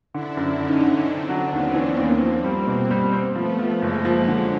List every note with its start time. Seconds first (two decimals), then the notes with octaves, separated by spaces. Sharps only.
0.14 D3 D4 E4
0.37 F#2
0.60 D3 C#4 D#4
0.83 D3
1.06 D3 C4 D4
1.29 F#3
1.52 D#2 B3 C#4
1.75 E3
1.98 D#2 A#3 C4
2.21 F3
2.44 G3
2.67 B2
2.91 G3
3.13 C4
3.35 F3 A3 B3
3.59 F3
3.82 F#1 G#3 A#3
4.05 F3
4.28 D3 F#3 G#3